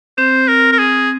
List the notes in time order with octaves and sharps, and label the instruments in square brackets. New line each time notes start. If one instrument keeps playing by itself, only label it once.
[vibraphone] C4 [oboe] C5
[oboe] A#4
A#4
G#4